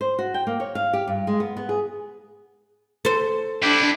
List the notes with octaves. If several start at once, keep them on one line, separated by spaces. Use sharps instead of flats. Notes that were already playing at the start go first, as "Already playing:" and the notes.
C5
F#4
G5
A#3
C#5
F5
G4
G2
G#3
B3
B3
G#4
A4 C5
D4 E4 G4